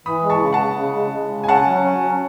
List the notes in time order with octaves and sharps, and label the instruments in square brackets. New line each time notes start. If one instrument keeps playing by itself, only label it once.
[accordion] E3 [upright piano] B5 D#6
[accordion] G#3
[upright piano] A5 C#6
[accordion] C#3
[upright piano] F#5 A5
[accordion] C#3
C#3
G#3
G#3
C#3
[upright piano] G#5
[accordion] C#4 [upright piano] F#5 A5
[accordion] F#3
C#4
F#3